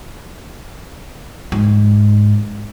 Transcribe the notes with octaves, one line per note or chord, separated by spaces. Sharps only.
G#2